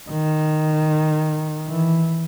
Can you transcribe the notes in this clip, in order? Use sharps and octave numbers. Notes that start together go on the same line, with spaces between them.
D#3
E3